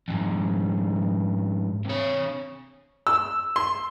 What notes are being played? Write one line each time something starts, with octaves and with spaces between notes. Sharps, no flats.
F2 G#2
C3 C#5
E6
C6